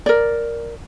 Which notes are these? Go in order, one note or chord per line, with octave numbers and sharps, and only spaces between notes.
A#4 D5